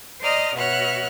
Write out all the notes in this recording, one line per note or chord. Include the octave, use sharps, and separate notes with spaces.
C5 D5 D#5 A#5 D#6 F6
B2 F#4 C#5 E5 F6 F#6